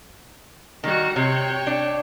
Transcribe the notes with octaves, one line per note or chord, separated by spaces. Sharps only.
D#3 G3 F#4
C3 C#5 G5
D4